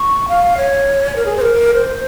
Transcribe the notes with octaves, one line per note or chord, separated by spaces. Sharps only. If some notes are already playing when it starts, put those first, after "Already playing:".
Already playing: C#6
F5
C#5
A#4
G#4
C5
A#4
C5